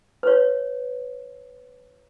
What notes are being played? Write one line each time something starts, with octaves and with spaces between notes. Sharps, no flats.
B4 C#5